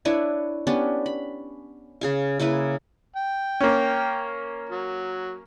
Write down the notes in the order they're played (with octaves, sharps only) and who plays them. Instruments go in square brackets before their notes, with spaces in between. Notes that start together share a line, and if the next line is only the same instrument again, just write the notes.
[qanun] D4 E4 B4 C#5
B3 C#4 D4 G4
B5
C#3 G#4 F5
C#3 A#3 E4 B4
[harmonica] G5
[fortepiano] A#3 C#4
[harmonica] F#3